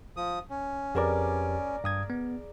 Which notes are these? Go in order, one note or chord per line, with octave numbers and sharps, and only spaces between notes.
F3 D#6
C#4
F2 G4 G#4 A#4 B4 D5
G2 D#6 G#6
B3